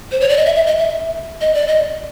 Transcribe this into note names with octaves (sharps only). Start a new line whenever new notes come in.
C5
C#5
D5
D#5
E5
E5
D#5
E5
D#5
D5
D#5